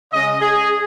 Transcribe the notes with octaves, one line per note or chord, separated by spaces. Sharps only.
C#3 G#3 C#4 D#5
G#4